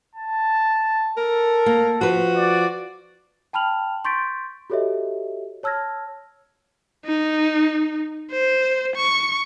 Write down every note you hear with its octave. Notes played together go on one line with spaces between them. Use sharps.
A5
A4 A#4
A#3
F3 F#4 B4
D5
G5 A5 B5 F6 F7 F#7
C6 C#6 G6 A6 B6 D7
F#4 G4 A4 C#5 D#5 E5
C#5 A5 E6 F6 G#6 A#6
D#4
C5
C#6